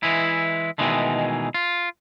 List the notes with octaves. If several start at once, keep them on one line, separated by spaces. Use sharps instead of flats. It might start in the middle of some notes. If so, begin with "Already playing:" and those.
E3 G#3 E4
B2 D#3 E3 G#3 A3
F4